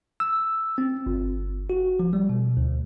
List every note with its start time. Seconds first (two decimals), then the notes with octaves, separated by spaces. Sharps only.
0.20 E6
0.78 C4
1.06 G1
1.70 F#4
1.99 F3
2.13 G3
2.30 B2
2.57 D2